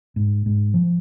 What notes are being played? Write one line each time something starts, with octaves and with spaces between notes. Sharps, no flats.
G#2
G#2
F3